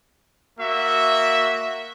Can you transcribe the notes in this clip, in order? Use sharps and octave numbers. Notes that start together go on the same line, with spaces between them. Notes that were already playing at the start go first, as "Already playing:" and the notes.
A#3 F#4 E5